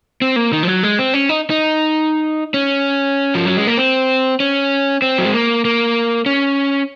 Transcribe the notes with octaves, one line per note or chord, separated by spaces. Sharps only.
C4
A#3
D#3
F3
F#3
G#3
C4
C#4
D#4
D#4
C#4
F3
F#3
G#3
A#3
C4
C#4
C4
F#3
G#3
A#3
A#3
C#4